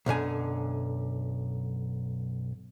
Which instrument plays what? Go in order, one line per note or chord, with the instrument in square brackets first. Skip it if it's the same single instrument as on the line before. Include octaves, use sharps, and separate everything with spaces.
[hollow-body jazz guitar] B1 F#2 D3 G#5